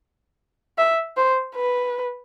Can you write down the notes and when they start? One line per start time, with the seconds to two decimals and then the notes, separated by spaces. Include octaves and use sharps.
0.78 E5
1.17 C5
1.55 B4